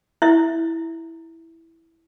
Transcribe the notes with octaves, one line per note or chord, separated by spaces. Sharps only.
E4 E5